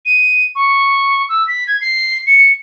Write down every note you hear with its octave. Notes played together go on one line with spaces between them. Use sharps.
D#7
C#6
E6
B6
G#6
C7
C#7